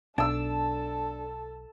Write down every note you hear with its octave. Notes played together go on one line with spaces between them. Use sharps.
B1 D4 A4 A5 E6